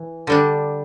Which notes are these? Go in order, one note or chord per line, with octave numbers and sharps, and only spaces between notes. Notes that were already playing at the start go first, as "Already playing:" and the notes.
Already playing: E3
D3 G3 D4